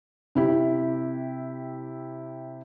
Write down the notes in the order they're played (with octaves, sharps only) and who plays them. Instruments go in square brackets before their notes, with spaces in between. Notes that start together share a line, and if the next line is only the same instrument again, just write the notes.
[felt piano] C3 E4 G4